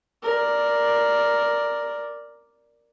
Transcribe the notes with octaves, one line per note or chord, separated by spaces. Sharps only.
A#4 D5